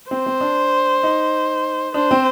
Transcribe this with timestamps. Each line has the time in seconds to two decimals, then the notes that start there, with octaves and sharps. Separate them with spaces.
0.11 C4 C5
0.26 C4
0.41 D4
1.03 D#4
1.94 D4 C5
2.11 C4